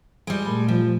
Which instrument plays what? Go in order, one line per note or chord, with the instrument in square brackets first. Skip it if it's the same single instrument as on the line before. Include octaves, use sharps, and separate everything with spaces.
[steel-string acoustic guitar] G3 G#3
[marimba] A#2 A3 B5
[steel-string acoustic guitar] F3